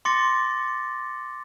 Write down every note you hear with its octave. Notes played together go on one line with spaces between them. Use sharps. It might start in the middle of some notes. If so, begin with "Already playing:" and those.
C6 D6 A6 A#6 C#7